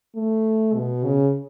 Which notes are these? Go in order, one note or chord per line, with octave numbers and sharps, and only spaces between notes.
A3
B2
C#3